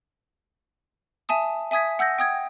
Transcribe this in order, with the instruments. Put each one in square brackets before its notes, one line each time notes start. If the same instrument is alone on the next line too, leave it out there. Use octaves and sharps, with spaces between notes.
[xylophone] E5 G#5 A5 D#6
E5 G#5 D#6 G#6 B6
F#5 E6 G6 A#6
G5 D#6 G#6